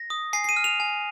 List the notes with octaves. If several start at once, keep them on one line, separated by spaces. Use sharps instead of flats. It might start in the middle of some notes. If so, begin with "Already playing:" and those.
Already playing: A#6
D#6
G#5 C7
C7
D#7
F6
F7
G#5